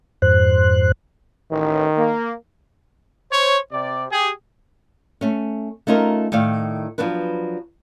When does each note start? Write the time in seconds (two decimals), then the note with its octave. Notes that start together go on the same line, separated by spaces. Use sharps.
0.22 F2 G#2 C5 F#6
1.51 A1 D#3
1.97 A#3
3.31 C5 C#5
3.72 C3 D5
4.11 G4 G#4
5.21 A3 C#4
5.87 A3 C#4 D#4 F4 A#4
6.32 A2 D#3 D5 F5
6.98 F3 F#3 B3 D4 B4